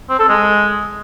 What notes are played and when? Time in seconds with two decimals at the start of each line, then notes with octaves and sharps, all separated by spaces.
0.09 C4
0.19 A4
0.29 G#3